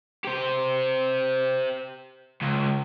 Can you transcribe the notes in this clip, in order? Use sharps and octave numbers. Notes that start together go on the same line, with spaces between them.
G4 C5
C#2